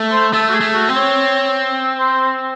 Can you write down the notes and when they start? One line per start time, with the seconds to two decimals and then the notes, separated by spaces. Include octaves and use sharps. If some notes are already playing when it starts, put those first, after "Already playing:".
Already playing: A3
0.12 C5
0.33 A3 A4
0.49 F#4
0.54 G#4
0.61 A3
0.74 F#4
0.89 C4
0.96 C#5
1.99 C5